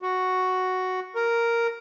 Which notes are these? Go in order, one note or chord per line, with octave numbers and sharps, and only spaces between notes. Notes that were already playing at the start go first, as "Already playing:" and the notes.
F#4
A#4